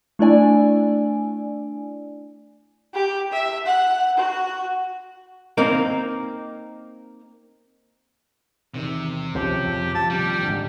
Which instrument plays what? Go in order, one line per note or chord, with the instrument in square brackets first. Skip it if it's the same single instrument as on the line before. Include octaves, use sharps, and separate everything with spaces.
[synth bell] A3 D4 E4 D5 G#5
[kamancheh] G4
E5
F#5
F#4
[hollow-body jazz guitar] A#3 C4 D#4 A#4
[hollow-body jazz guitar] E2 D#3 [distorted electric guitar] C3
[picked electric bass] C#2 F3 [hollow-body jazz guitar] C#3 C#4 C5 [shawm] G4
[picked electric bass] F2 F3
[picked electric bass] F3 [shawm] A5
[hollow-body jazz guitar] D#2 C3 [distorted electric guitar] G3 [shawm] G4
[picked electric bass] G#2 D3